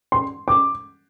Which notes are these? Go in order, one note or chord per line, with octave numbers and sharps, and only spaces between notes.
C6
D6